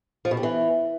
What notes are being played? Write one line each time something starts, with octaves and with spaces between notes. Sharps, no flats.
F3
B2
G3
E3